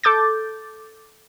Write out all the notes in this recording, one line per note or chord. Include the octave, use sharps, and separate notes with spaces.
A4 D6 G6 A6